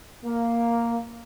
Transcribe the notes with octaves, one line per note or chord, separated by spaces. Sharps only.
A#3